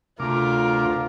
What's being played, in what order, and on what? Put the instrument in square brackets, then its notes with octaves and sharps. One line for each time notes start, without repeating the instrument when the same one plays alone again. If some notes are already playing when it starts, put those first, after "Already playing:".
[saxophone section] D2 [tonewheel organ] C3 D6 [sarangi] F4 [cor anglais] A#4